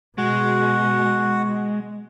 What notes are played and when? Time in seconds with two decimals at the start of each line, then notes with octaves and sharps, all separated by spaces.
0.18 B2 G#3 F#4